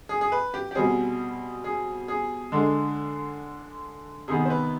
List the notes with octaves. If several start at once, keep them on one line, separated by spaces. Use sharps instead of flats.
G#4
G#4
B4
G4
G4
B2 G3 C4 G#4
G#4
G#4
D3 G#3 D4
C3 D#3 B3 G#4
C5
B4